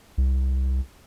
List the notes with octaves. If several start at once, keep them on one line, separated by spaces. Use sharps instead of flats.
C2